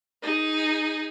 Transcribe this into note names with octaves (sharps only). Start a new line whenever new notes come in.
D#4 G#4